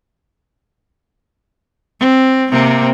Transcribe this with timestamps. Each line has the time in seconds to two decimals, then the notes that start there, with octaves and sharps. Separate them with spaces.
2.00 C4
2.51 C3 A#3 C4